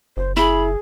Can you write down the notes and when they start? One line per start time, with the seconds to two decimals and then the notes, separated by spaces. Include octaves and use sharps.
0.17 F#1 C5
0.37 E4 G#4 B5